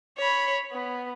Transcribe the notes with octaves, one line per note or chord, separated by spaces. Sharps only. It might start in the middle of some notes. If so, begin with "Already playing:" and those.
C#5 B5
B3